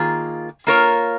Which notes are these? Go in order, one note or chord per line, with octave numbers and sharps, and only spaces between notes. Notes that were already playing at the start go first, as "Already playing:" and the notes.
Already playing: D#3 A#3 F4 G#4
A#3 F4 A#4 C#5